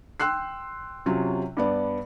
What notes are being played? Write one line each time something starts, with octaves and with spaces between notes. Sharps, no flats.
G5 C6 E6 F#6 C7
C3 F#3 C#4 F4
G2 B3 D5